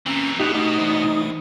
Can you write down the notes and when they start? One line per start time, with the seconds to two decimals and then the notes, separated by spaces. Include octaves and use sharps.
0.06 A#2 E3 C4 C#4 A#5
0.39 B2 A3 D#4 F#4 G4 D#6 F#6 B6
0.55 A3 D#4 F#4 G4
0.78 E3 D4 C5